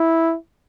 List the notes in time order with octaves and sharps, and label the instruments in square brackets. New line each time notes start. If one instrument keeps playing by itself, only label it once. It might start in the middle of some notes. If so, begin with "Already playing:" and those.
Already playing: [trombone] E4